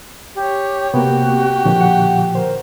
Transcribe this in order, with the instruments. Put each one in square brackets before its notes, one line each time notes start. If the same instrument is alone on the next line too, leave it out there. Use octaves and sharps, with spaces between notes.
[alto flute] G4 [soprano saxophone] C#5
[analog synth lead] C3 [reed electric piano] A#3 B3 [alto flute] F#4 [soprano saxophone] G4
[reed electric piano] A#2 D3 F3
[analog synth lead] F#5
[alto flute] A#4 [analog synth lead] C5